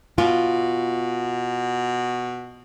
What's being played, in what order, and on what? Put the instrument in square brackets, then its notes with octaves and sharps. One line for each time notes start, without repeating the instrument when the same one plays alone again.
[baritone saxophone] B2 [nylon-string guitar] F4